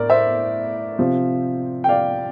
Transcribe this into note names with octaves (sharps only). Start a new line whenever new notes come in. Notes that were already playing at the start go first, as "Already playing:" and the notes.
Already playing: A2 A#4 D5
C5 E5
C3 F3
G5
D5 F5